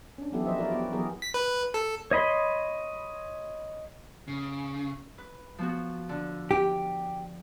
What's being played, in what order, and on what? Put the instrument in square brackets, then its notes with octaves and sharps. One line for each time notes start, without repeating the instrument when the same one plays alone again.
[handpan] C#4 D4
E3 F#3 B3 E4 G4 A4
F3 F4 F#4 C5 D#5 E5
E4 G4 A#4 D5
B3 F#4 G4
E3 F#3 B3 G#4 A#4
[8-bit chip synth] B6
B4
A4
[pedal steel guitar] C#5 D#5 B5 C6
[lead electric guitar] C#3
[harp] B4
F3 B3 F#4
D3
[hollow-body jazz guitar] G4